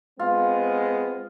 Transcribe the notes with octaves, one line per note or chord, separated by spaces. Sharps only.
G#3 B3 C4 F4